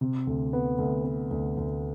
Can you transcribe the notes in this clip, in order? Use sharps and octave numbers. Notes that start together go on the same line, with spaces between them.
C3
D2
B3
D2
B3
D2
D2